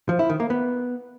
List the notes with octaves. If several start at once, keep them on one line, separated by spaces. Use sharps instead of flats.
F3
E4
D#3
A#3
B3